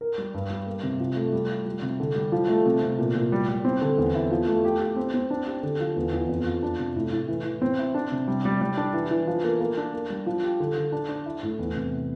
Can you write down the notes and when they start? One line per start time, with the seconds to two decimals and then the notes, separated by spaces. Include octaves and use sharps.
0.01 A#4
0.18 G3
0.34 G2
0.50 G3
0.66 A#3
0.83 C3
1.00 F3
1.16 A3
1.32 G3
1.50 F4
1.66 G3
1.82 C3
2.00 D3
2.15 G3
2.32 F3
2.48 A3
2.66 C3
2.82 C3
2.99 A#2
3.15 A#2
3.32 G3
3.48 G3
3.65 C4
3.82 D3
3.98 E2
4.15 E4
4.31 F3
4.47 A3
4.65 G4
4.80 G4
4.96 C4
5.14 C4
5.31 D4
5.46 G4
5.63 D3
5.80 F3
5.96 E2
6.13 E2
6.29 F2
6.46 F3
6.63 D4
6.79 C3
6.96 A2
7.12 A2
7.28 E3
7.45 E3
7.62 C4
7.79 E4
7.94 D4
8.12 C3
8.28 G3
8.45 G3
8.61 G3
8.77 D4
8.93 E3
9.11 E3
9.27 F3
9.44 A#3
9.60 A#3
9.77 D4
9.93 A#3
10.10 G3
10.26 F3
10.43 G4
10.60 D3
10.77 D3
10.92 D4
11.09 D4
11.26 E4
11.43 A2
11.59 E2
11.75 C3